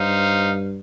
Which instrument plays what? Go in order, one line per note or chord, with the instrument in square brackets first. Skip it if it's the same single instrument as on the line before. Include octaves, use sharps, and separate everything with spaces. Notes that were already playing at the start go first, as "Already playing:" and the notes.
Already playing: [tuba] G2 [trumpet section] D#4 C5 F5